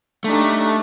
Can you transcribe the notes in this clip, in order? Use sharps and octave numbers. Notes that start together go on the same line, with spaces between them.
A3 D4 D#4 G4